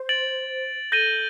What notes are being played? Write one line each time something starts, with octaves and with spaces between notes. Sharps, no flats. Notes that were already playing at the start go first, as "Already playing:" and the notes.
Already playing: C5
A6 D7 F#7
A4 G6 A#6 D#7 G7